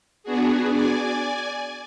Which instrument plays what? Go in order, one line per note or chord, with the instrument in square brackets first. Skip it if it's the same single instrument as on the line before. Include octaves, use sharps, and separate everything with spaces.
[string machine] B3 D4 F#4 G#4
D5 G#5